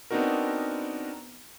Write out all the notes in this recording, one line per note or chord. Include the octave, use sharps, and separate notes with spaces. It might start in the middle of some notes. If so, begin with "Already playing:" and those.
B3 C4 D4 D#4 F#4 A#4